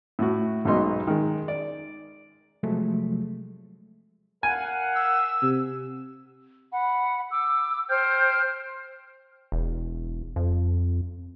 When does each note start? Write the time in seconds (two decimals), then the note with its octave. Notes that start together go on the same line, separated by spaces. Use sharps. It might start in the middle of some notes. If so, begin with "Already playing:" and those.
0.19 A2 F#4
0.65 B1 G#2 B2 B3 D#4 C6
1.07 D#3 G#3
1.48 D5
2.63 C3 F3 F#3 G#3 A3
4.43 A#4 F5 F#5 G#5
4.95 E6
5.42 C3
6.73 F#5 B5
7.31 D6 E6
7.89 C5 G5 F6 G6
9.52 E1
10.36 F2